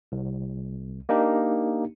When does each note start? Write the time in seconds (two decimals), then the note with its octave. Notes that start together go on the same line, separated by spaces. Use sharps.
0.12 C2
1.09 A#3 D4 D#4 G4